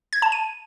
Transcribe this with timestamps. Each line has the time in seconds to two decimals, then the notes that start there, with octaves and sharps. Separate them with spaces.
0.13 G#6
0.22 A5
0.32 D#7